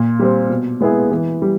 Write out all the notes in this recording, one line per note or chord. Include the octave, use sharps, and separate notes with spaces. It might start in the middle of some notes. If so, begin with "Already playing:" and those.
Already playing: A#2
G3 C4
B2
G#3 B3 E4 G#4
E3
G3